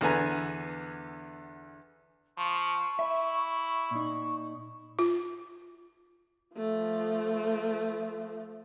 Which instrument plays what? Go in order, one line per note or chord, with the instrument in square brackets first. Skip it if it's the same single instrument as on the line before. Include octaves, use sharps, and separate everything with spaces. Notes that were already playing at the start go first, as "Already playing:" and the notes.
[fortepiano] E2 D3 B3 G#5 A#5
[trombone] F3 [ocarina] C#6
[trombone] E4 [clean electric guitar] E5
[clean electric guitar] A#2 D#4
[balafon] F4
[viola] F3 A3